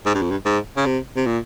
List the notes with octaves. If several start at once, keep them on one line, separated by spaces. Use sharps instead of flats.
G#2
G2
F2
G2
G#2
C#3
C3
C3
A#2